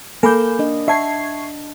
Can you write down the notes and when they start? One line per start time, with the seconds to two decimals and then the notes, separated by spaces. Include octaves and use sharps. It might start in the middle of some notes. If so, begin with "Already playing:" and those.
0.23 A#3 A4 G#5 B5 D6 G6
0.59 D4 D#5
0.88 E5 F#5 A5 C#6 G#6 C7